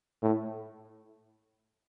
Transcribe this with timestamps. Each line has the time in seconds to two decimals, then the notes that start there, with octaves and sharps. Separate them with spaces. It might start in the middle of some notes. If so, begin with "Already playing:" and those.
0.23 A2